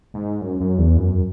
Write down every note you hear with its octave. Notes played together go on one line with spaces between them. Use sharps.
G#2
F#2
F#2
E2
F#2